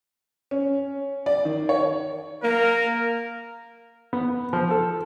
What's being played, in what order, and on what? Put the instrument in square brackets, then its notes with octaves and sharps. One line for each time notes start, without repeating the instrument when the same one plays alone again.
[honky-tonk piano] C#4
D5
D#3
C#5
[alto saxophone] A#3 [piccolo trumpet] A#4
[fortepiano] B3
F3
A4